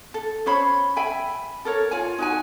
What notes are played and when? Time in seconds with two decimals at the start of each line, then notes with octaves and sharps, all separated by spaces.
0.14 A4
0.46 C#4 C5 C#5 B5
0.96 E5 G5 G#5 B5
1.65 A4 A#4 C#5
1.91 F4 C#5 G#5
2.18 D#4 F#4 G#5